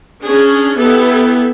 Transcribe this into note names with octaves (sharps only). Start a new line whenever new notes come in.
C#4 D4 G#4
B3 E4 G4 A4 B4